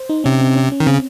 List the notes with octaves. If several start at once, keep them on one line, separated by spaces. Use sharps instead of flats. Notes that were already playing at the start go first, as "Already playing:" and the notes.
Already playing: C5
D#4
C3 C#4
C4
C#4
C#4
D#3
C#3 C4